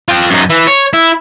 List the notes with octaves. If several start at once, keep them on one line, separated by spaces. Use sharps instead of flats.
F4 G5
F#2 D#4
E3
C#5
E4